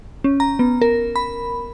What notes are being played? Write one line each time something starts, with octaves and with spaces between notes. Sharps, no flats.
C#4
A#5
B3
A#4
B5